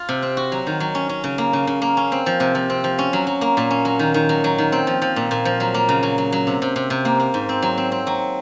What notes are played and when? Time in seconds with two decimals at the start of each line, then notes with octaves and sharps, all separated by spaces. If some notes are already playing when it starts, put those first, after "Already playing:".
Already playing: F4
0.09 C3
0.22 C4
0.37 F#4
0.52 F#3
0.67 D#3
0.80 F#3
0.95 C#4
1.09 C#4
1.24 C#3
1.38 A#3
1.53 C#3
1.67 C#3
1.82 A#3
1.97 C#4
2.12 C4
2.26 F3
2.40 C3
2.55 F3
2.70 C4
2.84 F3
2.99 C#4
3.13 F#3
3.27 F#3
3.41 A#3
3.57 A#2
3.70 C#4
3.85 F#3
3.99 D#3
4.14 D#3
4.29 F#3
4.44 F#3
4.58 D#3
4.72 C4
4.87 F3
5.02 F3
5.16 A#2
5.31 A#2
5.45 F3
5.60 F#3
5.74 A#3
5.89 C#3
6.03 F#3
6.18 F#3
6.32 F#3
6.47 C3
6.62 C3
6.76 C3
6.90 C3
7.05 A#3
7.20 A#3
7.34 G#2
7.49 C4
7.62 F#3
7.78 C4
7.92 C4
8.07 F#3